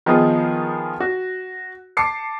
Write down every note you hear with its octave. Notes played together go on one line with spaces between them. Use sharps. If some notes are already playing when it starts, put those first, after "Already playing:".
D#3 F3 B3 D#4 F4 G#4
F#4
A5 D6 C7 C#7